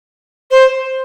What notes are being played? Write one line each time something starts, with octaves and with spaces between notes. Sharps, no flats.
C5